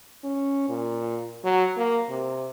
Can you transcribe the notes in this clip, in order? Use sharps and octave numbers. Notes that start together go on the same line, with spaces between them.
C#4
A#2
F#3
A#3
C3